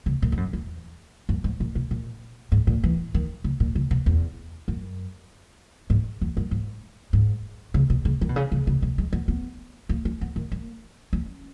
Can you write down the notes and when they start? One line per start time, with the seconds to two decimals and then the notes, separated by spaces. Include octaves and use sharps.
0.06 C#3
0.22 A#2
0.32 G#2
0.37 F#2
0.53 E2
1.29 F#2
1.44 G#2
1.60 A#2
1.75 B2
1.91 A#2
2.52 G#2
2.67 A#2
2.84 E3
3.14 D#3
3.44 C#3
3.60 A#2
3.75 C#3
3.91 B2
4.06 E2
4.68 F#2
5.90 G#2
6.21 E2
6.37 F#2
6.51 G#2
7.13 G#2
7.74 C#3
7.90 B2
8.05 C#3
8.21 D#3
8.29 B2
8.36 C#3
8.52 C#3
8.67 C#3
8.82 B2
8.98 G#3
9.13 B3
9.28 B3
9.89 A#3
10.05 C#4
10.21 B3
10.36 D#3
10.52 A#3
11.13 C#4